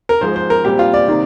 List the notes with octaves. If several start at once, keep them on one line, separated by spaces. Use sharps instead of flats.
A#4
G#2 F3 G#3 C5
C5
A#4
A#2 G3 C4 G4
F4
D5
C3 D#3 A#3